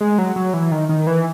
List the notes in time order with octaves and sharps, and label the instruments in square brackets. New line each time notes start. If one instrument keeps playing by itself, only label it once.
[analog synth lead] G#3
F#3
F#3
E3
D#3
D#3
E3